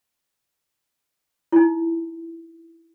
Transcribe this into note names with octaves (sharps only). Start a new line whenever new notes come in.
D#4 E4